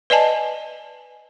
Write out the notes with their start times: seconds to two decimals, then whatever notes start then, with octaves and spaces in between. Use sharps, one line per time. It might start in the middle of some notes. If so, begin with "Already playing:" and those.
0.10 B4 D5 D#5 G#5 A5